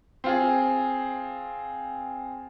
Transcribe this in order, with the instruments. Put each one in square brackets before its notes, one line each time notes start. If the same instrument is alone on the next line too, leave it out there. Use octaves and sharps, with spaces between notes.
[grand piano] C4 F4 G#4